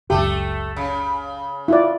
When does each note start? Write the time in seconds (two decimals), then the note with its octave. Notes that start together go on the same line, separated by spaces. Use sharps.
0.10 F#1 C#2 F#2 A3 G4 A4
0.76 C#3
1.68 E4 F4 D5